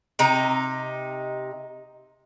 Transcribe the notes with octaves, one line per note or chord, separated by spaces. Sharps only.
C3 D#4 A#5